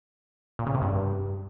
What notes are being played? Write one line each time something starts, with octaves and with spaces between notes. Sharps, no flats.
A#2
C#3
C3
G2